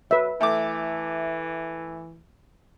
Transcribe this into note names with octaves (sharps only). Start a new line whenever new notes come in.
F#3 B4 E5
E3 A3 D6